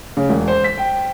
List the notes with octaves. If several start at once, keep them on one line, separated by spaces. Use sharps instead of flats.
C#3
E1
C5
B6
G5